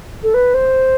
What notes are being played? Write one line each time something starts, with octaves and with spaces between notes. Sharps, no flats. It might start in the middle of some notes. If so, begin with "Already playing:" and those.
A4
B4
C5